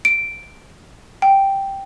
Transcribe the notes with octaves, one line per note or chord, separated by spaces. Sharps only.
D7
G5